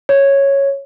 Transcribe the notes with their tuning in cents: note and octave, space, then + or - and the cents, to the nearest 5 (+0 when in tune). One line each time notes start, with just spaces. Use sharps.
C#5 -5